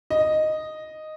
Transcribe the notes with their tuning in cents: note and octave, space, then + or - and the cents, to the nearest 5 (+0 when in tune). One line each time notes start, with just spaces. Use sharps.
D#5 -5